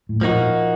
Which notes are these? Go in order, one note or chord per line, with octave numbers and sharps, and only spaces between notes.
A2
A#2 F3 A#3 D#4 F#4